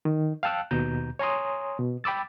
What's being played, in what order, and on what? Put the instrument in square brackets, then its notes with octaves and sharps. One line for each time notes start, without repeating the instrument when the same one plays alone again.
[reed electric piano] D#3
F5 G5 A5 E6 F#6
D#2 B2 A#5 G6
C#5 G#5 A#5 C6 D#6
B2
G5 B5 D6 E6 A6